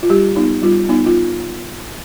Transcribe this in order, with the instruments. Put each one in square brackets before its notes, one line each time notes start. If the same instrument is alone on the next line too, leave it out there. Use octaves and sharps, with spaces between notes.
[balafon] F4
G3 G4
B3 D#4
G3 F4
B3 D#4
F4